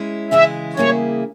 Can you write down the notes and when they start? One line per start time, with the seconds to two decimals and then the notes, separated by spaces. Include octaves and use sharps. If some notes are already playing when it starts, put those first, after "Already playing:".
Already playing: G#3 C#4 E4
0.31 C#3 E3 G#3 E4 E5
0.76 C#3 G3 A#3 E4 G#4 C#5